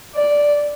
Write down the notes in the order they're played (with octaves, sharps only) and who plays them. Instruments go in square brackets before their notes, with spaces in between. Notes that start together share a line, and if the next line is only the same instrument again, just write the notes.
[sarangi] D5